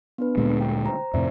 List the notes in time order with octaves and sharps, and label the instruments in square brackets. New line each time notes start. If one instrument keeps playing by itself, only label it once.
[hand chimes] B3 D4 B4
[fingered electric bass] D2 A#2 G#3
[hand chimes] G5
C5 A#5
[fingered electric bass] F2 A2 C3 [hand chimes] C5 D5 E5